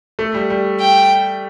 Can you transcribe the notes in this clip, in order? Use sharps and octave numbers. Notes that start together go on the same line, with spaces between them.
A3
G3
G3
G5